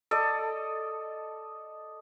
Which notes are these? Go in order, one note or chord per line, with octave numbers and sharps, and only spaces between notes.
A4 D5 D#5